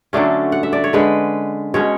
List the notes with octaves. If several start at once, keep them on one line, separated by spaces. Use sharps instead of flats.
D3 F#3 A3 C#4 D4
F#5
E5
D5
C#5
D3 G#3 C#4 B4
B2 G#3 C#4 C#5